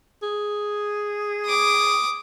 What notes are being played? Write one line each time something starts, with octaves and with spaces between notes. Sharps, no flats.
G#4
D6 D#6